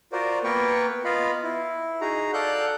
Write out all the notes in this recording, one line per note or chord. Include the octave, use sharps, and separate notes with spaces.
F4 F#4 A#4 C5 D5
A#3 B3 A#4 B4 G5 C#6
B3 F4 D#5 F5 B5
E4
D#4 F#4 G#4 A#5
A4 D5 F5 F#5 F#6 G6